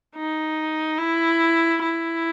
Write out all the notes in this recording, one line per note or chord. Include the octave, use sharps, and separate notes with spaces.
D#4
E4
E4